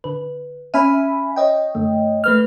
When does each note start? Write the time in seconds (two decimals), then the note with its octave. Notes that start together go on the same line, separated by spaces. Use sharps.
0.04 D3 B4
0.74 C#4 E5 G#5 B5 F6 D#7
1.36 C#5 D#5 G5
1.75 F#2 D3 A3
2.24 A3 B4 F6